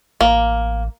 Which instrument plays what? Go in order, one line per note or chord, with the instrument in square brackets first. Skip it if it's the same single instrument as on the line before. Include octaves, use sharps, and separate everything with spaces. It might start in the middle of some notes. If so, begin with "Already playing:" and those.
[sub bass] A1 [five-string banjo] A#3